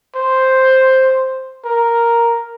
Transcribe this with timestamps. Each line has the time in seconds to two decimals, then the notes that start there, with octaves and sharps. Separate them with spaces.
0.15 C5
1.65 A#4